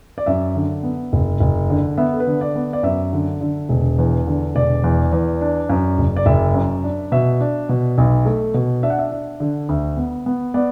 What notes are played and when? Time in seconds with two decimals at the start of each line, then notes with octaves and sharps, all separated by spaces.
0.18 D5
0.26 F#2 E5
0.56 D3
0.83 B3
1.13 F#1
1.40 F#1
1.70 D3
1.98 B3 E5
2.14 A4
2.20 B4
2.27 D3
2.41 D5
2.56 B3
2.73 D5
2.83 F#2 E5
3.13 D3
3.41 D3
3.69 E1
3.98 E2
4.27 D3
4.55 E1 D5
4.84 E2
5.12 E2
5.41 D4
5.69 F#2
5.98 F#1
6.17 D5
6.26 F#1 E5
6.54 F#2
6.84 D4
7.12 B2 E5
7.40 D4
7.69 B2
7.98 B1
8.26 A3
8.54 B2
8.83 D4 E5
8.90 F#5
8.99 E5
9.11 D4
9.40 D3
9.69 D2
9.97 B3
10.26 B3
10.54 B3 D5